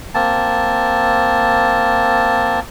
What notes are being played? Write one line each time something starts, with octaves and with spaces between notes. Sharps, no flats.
A#3 C4 A5